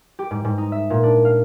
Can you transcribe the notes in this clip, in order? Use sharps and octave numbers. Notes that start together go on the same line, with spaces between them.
G4
G#2
G#2
D#4
E5
A#2
D4
F5